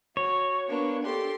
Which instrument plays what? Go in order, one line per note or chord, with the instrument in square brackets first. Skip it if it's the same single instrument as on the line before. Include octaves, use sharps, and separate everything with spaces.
[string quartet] F#4 [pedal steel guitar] C#5
[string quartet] A#3 B3 D4
G4 A4 C6